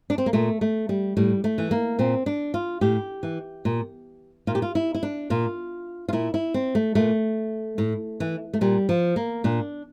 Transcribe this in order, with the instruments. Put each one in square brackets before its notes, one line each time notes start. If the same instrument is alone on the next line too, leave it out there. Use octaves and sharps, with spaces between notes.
[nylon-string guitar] D4
C4
A#3
A#2 A3
A3
G3
A2 G3
A3
E3
A#3
A#2 C4
D4
F4
A2 G4
E3
A#2
A#2 F4
G4
F4
E4
E4
D4
A#2 F4
F4
A#2 E4
E4
C4
A3
A#2 A3
A2
E3
A3
A#2 G3
F3
A#3
A#2 D4